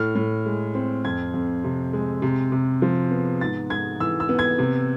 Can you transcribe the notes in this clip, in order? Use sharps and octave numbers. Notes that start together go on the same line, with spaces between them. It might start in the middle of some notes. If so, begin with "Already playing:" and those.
Already playing: A2 F6
A2
G#3
C4
F2 G#6
F2
C3
G#3
C3
C3
F3
B3
G#2 A6
G#2 G#6
E3 E6
E6
B3
G#6
C3